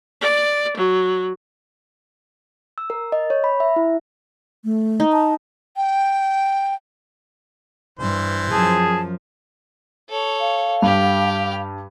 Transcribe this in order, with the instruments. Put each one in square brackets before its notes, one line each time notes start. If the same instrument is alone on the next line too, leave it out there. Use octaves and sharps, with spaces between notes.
[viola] D5
F#3
[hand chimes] E6
A#4
D#5
C#5
B5
E5
E4
[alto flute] A3
[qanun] D#4
[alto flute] A5
[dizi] G5
[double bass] G2 [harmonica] E3 C5
[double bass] F#2 F3 [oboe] G#4 [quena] A5
[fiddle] A4 C#5
[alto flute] F5
[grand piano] G2 [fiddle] G4 F6